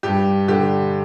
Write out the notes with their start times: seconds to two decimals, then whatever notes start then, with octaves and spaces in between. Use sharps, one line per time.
0.03 G2 G4
0.48 D3 G4